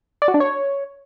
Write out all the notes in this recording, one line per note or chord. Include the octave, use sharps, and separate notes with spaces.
D5
F#4
D4
C#5